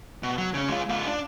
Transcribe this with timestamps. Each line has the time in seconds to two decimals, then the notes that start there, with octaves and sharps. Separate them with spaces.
0.23 B2
0.38 F#3
0.54 C#3 C#4
0.69 G#3 F4
0.89 G#2 F4
1.07 D4